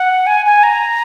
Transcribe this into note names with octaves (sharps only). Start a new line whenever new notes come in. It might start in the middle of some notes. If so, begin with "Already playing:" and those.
Already playing: F#5
G#5
G#5
A#5